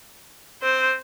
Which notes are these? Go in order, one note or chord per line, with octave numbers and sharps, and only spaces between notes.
C4 C5